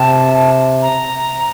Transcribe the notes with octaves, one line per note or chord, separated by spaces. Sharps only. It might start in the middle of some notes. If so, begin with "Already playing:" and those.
Already playing: C3 A5
A#5